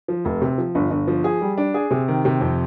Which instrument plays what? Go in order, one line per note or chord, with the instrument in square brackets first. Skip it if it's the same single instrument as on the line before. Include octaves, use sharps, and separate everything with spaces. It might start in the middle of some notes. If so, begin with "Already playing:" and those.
[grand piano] F3
F1
C3
F3
G1
G1
F3
G#4
G3
D4
G#4
C3
D#3
C3
F2